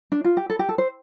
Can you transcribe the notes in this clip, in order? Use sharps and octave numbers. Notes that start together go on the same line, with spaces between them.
D4
F4
G4
A4
G4
A4
C5